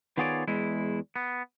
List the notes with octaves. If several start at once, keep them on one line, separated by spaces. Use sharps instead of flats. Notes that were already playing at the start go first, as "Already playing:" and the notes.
D#3 B3 F4 G#4 C#5 D5
E2 G#3 E4
B3